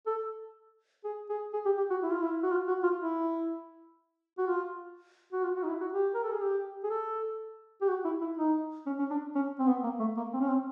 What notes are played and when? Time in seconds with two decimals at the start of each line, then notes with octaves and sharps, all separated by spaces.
0.07 A4
1.04 G#4
1.30 G#4
1.53 G#4
1.65 G4
1.77 G4
1.90 F#4
2.03 E4
2.12 F4
2.22 E4
2.43 F#4
2.51 F4
2.68 F#4
2.83 F4
3.00 E4
4.38 F#4
4.47 F4
5.33 F#4
5.44 F4
5.56 F#4
5.64 D#4
5.69 E4
5.81 F#4
5.93 G4
6.14 A#4
6.23 A4
6.32 G#4
6.41 G4
6.83 G#4
6.90 A4
7.82 G4
7.89 F#4
8.05 E4
8.22 E4
8.38 D#4
8.86 C#4
8.99 C#4
9.11 D4
9.35 C#4
9.59 C4
9.67 B3
9.84 A#3
10.00 A3
10.17 A#3
10.33 C4
10.40 C#4
10.48 C4